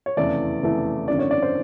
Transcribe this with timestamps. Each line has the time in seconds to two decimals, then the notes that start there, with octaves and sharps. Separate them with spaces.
0.06 C#5
0.17 F1 E2 C#3 E3 A3 D5
0.62 F1 E2 C#3 E3 A3
1.08 G#1 F#2 D3 D5
1.19 C#5
1.31 D5
1.43 C5